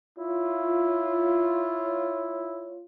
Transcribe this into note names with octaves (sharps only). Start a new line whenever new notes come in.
E4 F4 C#5